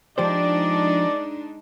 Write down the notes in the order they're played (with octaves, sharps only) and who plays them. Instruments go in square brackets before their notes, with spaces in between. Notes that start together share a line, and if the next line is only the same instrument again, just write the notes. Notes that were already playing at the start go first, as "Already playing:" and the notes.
[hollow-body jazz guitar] F3 G4 C5 [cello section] G#3 D4 D#4 [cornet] D5